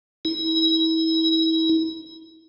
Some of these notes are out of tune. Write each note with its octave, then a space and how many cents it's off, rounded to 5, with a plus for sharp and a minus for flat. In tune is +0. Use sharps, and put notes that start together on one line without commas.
E4 -35